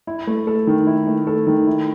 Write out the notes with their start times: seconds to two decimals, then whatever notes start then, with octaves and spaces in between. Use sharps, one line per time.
0.07 E4
0.27 A3
0.47 A4
0.67 D#3
0.87 E4
1.07 A3
1.27 A4
1.47 D#3
1.67 E4